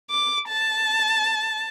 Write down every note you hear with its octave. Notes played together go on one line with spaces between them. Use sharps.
D6
A5